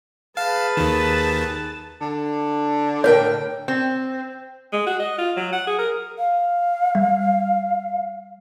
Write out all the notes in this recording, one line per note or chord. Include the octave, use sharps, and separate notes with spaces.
G#4 B4 F5 A5
D#2 D#3
D3
A2 A#4 C#5 G5
C4
G#3
F#4
D#5
F4
F#3
F#5
G#4
A#4
F5
G3